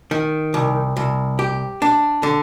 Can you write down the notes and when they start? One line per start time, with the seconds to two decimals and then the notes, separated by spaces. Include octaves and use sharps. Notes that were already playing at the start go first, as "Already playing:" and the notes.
0.11 D#3
0.54 C2
0.97 C2
1.39 G4
1.82 D4
2.23 D3